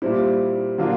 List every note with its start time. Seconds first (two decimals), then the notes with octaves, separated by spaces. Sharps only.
0.02 A#2 G3 C4 E4
0.78 D3 F#3 A#3 D4 F4